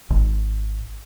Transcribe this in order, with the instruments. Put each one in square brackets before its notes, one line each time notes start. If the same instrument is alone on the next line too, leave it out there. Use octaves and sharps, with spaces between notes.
[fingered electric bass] G#1